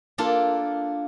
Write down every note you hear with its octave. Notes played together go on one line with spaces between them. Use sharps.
A#3 D4 F4 A4 A#4